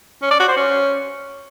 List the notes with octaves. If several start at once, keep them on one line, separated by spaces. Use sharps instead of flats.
C#4
D5
F#4
C5
C#4